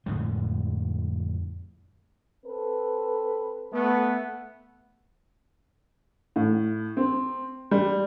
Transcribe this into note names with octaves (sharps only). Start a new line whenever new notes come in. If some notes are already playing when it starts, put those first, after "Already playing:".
F2 A2 D3 G#3
C4 A4 B4
A3 B3
A2
C4
G3